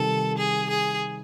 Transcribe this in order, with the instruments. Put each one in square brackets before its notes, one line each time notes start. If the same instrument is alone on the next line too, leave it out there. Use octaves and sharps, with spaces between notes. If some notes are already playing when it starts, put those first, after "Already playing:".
Already playing: [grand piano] C3 D#3 G3 [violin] A4
[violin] G#4
G#4